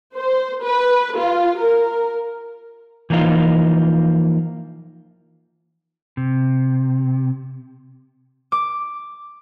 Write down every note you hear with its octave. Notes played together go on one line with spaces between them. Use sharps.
C5
B4
F4
A#4
E3 F3 A#3 D#4 F4
C3
D6